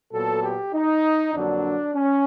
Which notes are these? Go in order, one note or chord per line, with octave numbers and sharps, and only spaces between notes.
A#2 F#3 B3 A4
G4
D#4
F2 D3 F#3 A#3 D4
C#4